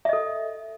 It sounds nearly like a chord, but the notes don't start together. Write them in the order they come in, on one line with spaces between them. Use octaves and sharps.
E5 D#5 A4